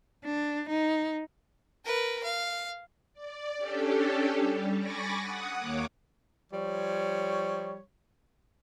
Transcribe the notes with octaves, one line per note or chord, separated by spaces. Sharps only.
D4
D#4
A#4 B4
F5
D5
C#4 D4 G4 A4
G3
G#5 B5 C#6 D6 A6 A#6
F#5 D#6
D#2 A#3 C#5 D6
F3 G3 C#5